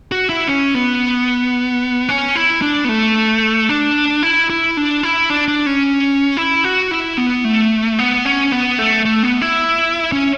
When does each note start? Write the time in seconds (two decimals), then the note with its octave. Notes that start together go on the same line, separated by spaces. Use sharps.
0.12 F#4
0.29 E4
0.47 C#4
0.75 B3
2.09 C#4
2.36 E4
2.62 D4
2.85 B3
2.89 A3
3.69 D4
4.23 E4
4.50 E4
4.77 D4
5.03 E4
5.30 D4
5.48 D4
5.66 C#4
6.37 E4
6.64 F#4
6.91 E4
7.18 B3
7.45 A3
7.99 B3
8.25 C#4
8.52 B3
8.79 A3
9.05 A3
9.23 B3
9.42 E4
10.12 C#4